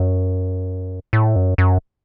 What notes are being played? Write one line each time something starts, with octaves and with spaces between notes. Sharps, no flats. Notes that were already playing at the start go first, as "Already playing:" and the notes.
Already playing: F#2
A2
F#2
F#2